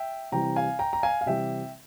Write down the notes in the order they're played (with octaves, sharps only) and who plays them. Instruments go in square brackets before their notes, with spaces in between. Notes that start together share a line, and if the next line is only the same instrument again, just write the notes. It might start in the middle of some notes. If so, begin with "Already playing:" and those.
Already playing: [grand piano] E5 G5
C3 E3 G3 G5 A#5
F5 G#5
G5 A#5
A#5
F5 G#5
F5
C3 E3 G3 E5 G5